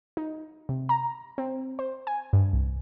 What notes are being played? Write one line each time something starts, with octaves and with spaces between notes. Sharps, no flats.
D#4
C3
A#5
C4
C5
G#5
G2
C2